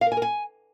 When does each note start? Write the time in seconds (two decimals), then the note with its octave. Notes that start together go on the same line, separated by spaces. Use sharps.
0.01 F5
0.06 A#4
0.12 G#5
0.17 A#4
0.22 G#5